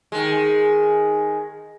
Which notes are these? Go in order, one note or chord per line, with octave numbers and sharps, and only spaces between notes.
D#3 G#3